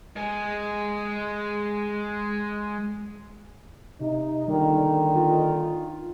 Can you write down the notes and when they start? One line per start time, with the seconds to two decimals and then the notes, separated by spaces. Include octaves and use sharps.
0.16 G#3 G#4
4.00 C3 D#4
4.48 A#2 D3 D#3 G3
5.15 F4